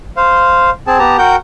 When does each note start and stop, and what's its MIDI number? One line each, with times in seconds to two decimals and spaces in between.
0.17 0.70 72
0.17 0.70 77
0.87 0.98 60
0.87 0.98 68
0.87 0.98 81
0.99 1.17 59
0.99 1.17 67
0.99 1.17 81
0.99 1.17 82
1.18 1.36 66
1.18 1.36 70
1.18 1.36 78
1.18 1.36 79
1.18 1.36 91